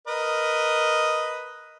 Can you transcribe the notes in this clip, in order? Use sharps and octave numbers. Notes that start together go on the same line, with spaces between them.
A#4 B4 D#5